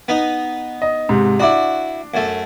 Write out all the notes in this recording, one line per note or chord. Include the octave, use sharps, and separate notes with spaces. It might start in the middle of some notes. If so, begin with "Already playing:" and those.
B3 D#4
D#5
G#2 C3
D4 E4 F#4 D6
F#2 A3